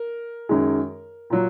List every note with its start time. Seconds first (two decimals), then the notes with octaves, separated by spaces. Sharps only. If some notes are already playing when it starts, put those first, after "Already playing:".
Already playing: A#4
0.49 F#2 D#3 G#3
1.30 A#2 F#3